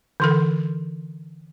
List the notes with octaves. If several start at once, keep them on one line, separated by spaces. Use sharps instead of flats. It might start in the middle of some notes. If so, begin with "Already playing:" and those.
D3 E3 A4